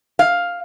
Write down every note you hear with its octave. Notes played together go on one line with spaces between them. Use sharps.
F5